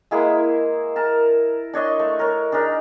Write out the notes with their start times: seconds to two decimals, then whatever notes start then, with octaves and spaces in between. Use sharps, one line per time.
0.11 G#3 A#3 E4 G#4
0.96 A#4 A5
1.74 D4 C#5 D#5 C6
1.99 A3
2.19 A#4 C#5
2.52 D4 D#4 G#4 A#4